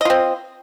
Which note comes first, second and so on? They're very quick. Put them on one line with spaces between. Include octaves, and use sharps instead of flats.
D#5 F4 C4